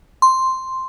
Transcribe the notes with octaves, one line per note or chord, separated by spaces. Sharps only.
C6